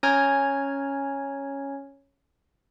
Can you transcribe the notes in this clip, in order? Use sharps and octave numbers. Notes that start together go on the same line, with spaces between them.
C#4 C#5 G#5 A#5 F6 G#6